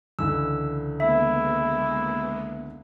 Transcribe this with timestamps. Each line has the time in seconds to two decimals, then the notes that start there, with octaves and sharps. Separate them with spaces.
0.19 C#2 D3 E3 E6
1.00 G#3 A#3 B3 E4 E5